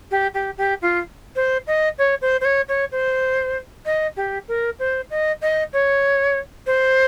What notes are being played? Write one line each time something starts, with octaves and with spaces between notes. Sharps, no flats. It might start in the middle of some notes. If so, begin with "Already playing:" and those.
G4
G4
G4
F4
C5
D#5
C#5
C5
C5
C#5
C#5
C5
D#5
G4
A#4
C5
D#5
D#5
C#5
C5